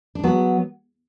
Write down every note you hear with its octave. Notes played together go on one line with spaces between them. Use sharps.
D4
F#3 B3